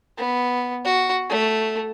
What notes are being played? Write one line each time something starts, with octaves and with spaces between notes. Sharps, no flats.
B3
F#4
A3